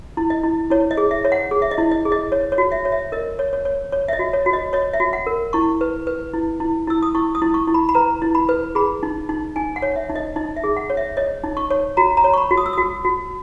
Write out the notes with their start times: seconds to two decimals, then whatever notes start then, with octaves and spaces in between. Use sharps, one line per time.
0.17 E4
0.30 D#5
0.44 E4
0.70 E4 C#5
0.91 D#5
0.97 G#4
1.11 E5
1.25 C#5
1.32 F#5
1.51 G#4
1.62 E5
1.71 D#5
1.78 E4
1.91 D#5
2.05 G#4
2.12 D#5
2.32 C#5
2.52 C#5
2.58 F#4
2.72 E5
2.85 C#5
2.92 E5
3.12 A#4 D#5
3.39 C#5
3.53 C#5
3.65 C#5
3.92 C#5
4.08 E5
4.13 D#5
4.19 F#4
4.33 C#5
4.46 F#4
4.53 D#5
4.73 C#5 D#5
4.93 E5
5.00 F#4
5.13 F#5
5.27 A#4
5.53 E4 C#6
5.81 B4
6.07 B4
6.34 E4
6.60 E4
6.87 E4 E6
7.02 D#6
7.15 E4 C#6
7.35 D#6
7.42 E4
7.54 C#6
7.67 E4
7.74 B5
7.89 B5
7.95 B4 A#5
8.22 E4
8.35 B5
8.49 B4
8.75 G#4 B5
9.03 D#4
9.29 D#4
9.56 D#4 G#5
9.76 F#5
9.82 C#5
9.96 E5
10.09 D#4
10.16 D#5
10.36 D#4 D#5
10.56 E5
10.64 G#4
10.77 F#5
10.90 C#5
10.97 E5
11.17 C#5 D#5
11.44 D#4
11.57 C#6
11.70 C#5
11.97 F#4 A#5
12.17 A#5
12.24 C#5
12.34 C#6
12.38 B5
12.51 F#4
12.57 D#6
12.66 E6
12.73 F#4 D#6
13.05 F#4